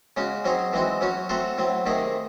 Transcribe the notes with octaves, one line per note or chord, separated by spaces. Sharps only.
C#3 G#3 C#4 F#4
F#3 C4 D#4 G#4 C#5
E3 G#3 C4 D#4 F#4
F#3 C#4 F#4 C#5
A3 C4 F#4 A4 C5
A2 F#3 C4
C3 D#3 A3 D#4 G#4